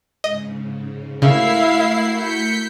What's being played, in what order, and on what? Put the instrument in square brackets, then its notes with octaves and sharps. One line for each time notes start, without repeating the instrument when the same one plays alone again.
[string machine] G#2 C#3 [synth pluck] D#5
[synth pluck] C#3 [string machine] A3 F#4 A#4 [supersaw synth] E4 C7 [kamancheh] E5 F5
[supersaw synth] G6 B6 C#7